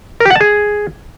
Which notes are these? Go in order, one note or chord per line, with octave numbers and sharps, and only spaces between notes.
A#4
G4
F#5
A5
G#4